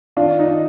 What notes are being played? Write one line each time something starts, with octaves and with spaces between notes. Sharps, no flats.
D#3 D4 F4
D#4